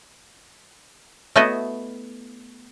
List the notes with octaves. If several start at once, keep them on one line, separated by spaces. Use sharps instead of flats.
A3 B3 E4 F#4 D#5